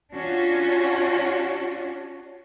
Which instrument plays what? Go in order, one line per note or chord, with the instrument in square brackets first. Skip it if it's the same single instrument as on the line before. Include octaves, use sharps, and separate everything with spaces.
[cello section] C#4 D4 F4 F#4 C#5